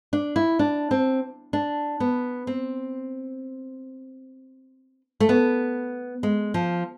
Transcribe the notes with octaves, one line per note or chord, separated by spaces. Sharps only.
D4
E4
D4
C4
D4
B3
C4
A3
B3
G#3
F3